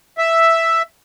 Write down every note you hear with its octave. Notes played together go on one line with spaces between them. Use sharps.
E5